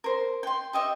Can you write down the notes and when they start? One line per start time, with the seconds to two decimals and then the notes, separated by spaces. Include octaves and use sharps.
0.04 A#4 C5
0.43 G5 C6
0.73 G4 D#5 E5